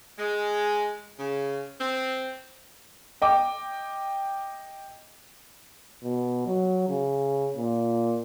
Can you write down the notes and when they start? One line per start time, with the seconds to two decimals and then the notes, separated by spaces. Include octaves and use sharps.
0.18 G#3
1.18 C#3
1.80 C4
3.22 D#5 G5 D6
6.04 B2
6.47 F#3
6.89 C#3
7.57 A#2